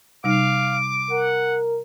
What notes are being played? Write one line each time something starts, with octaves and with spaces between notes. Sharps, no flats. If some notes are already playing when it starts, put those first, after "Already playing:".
C3 G3 D#4 F5 D6
A#4 F#5